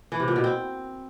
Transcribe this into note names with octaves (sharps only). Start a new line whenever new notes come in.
E3
C3
A#2
B2
C4